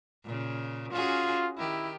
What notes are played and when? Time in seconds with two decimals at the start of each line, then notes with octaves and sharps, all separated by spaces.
0.24 A#2 C#3
0.93 C#4 F4 F#4 G#4
1.57 D#3 E4 G4